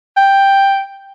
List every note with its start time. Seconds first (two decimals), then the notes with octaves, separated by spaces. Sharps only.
0.17 G5